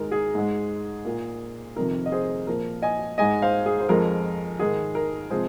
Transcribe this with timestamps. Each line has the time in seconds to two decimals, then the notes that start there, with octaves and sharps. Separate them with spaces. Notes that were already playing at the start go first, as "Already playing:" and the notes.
Already playing: G#2 D#3 G#3 A#4
0.12 G#4
0.35 G#2 G#3
1.05 A#2 A#3
1.76 F2 C3 D#3 A#4
2.06 D#5
2.12 G#4 C5
2.47 A#2 F3 A#3 A#4
2.82 D#5 G#5
3.18 G#2 G#3 D#5 G#5
3.42 C5 F5
3.66 G#4
3.80 C5
3.89 F2 F3 G#3 A#4
4.59 G#2 D#3 G#3 G#4
4.95 A#4
5.30 C3 F3 G#3 G#4 C5